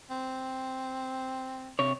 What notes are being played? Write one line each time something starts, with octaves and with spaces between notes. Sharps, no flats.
C4
C3 C#5